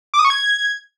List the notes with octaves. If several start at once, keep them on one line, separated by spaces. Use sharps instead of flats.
D6
D#6
C#6
G#6